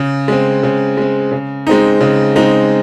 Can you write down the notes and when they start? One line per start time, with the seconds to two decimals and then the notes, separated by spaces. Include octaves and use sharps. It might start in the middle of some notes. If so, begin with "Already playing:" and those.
Already playing: C#3
0.28 G#3 C4
0.63 C#3
0.97 G#3 C4
1.32 C#3
1.67 G#3 C4 D#4
2.01 C#3
2.36 G#3 C4 D#4